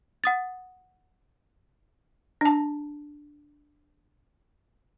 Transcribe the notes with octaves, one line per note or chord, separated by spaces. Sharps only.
F#5 D#6 A6
D4 A5